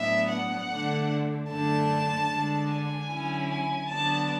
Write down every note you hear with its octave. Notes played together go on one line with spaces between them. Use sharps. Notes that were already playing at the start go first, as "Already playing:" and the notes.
Already playing: A2 F#3 B3 D4 E5
F#5
D3 A3 D4
F#2 D3 A3 D4 A5
D3 G#3 D4
G#5
D3 F#3 C#4 E4
G#5
D3 F#3 B3 D4 A5